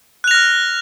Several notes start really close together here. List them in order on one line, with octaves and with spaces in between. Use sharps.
F#6 F7 A#6 F6